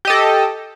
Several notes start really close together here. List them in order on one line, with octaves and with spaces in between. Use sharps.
G4 D#5 A4